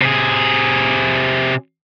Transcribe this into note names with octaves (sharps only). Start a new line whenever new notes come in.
C3 G#4